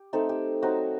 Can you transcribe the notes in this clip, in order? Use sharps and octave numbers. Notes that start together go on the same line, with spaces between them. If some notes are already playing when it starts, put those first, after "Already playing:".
Already playing: G4
A3 C4 D#4 A4
G4
F#3 C4 D#4 F#4